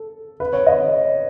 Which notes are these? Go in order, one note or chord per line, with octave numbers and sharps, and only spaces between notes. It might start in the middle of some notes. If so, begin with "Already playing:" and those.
Already playing: A4
B4
C#5
D#5